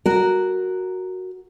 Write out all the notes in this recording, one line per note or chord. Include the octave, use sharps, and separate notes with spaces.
F#4 A#4